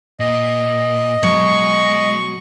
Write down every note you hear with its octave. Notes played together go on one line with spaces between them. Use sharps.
A#2 D#5
B2 F#3 G#3 C#6